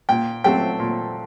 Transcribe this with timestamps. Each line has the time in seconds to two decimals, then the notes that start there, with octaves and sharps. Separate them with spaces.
0.09 A#2 G5
0.44 F#3 A3 C4 G5
0.79 A#2